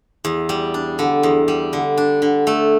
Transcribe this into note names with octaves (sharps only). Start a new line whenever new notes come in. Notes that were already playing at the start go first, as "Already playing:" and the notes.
E2
G3
D4
D3
E2
G3
D3
D4
D3
A3